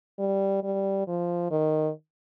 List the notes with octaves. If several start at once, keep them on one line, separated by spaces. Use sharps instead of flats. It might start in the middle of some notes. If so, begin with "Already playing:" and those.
G3
G3
F3
D#3